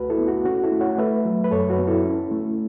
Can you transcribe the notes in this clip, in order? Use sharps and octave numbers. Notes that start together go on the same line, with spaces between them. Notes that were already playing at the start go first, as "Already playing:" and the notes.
Already playing: C#2 A3 F#4 B4
E4 A4
B3
F#4
C#4 F#4
E4 A4
A3
C#5 F#5
A3 B4 E5
F#3
B4
F#2 A4 C#5
F#4 B4
B3
E4 A4
C#4
A3